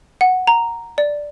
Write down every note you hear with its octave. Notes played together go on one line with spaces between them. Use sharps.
F#5
A#5
D5